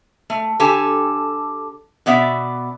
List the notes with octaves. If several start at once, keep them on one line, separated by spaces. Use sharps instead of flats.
A3
D3 G4 A4 G#5
B2 B3 D5 E5